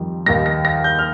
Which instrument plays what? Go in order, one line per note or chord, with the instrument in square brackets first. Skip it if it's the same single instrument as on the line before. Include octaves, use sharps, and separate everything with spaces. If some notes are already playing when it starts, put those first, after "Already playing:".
Already playing: [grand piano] F2 D#3 G3
D#2 D#3 G3 A#6
A#6
A#6
G6
F6